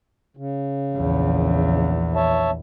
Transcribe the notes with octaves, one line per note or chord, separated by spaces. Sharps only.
C#3
A#1 E2
C#5 E5 A5